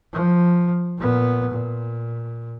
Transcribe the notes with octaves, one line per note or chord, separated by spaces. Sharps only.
F3
A#2 B3
A#2